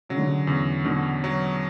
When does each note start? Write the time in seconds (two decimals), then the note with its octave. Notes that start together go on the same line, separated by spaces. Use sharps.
0.09 C#3 F#3
0.17 D3
0.25 C#3
0.47 E2 C#3
0.85 B2 D3
1.24 F#3